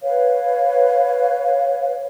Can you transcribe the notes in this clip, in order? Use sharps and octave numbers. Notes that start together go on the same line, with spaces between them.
B4 C#5 F5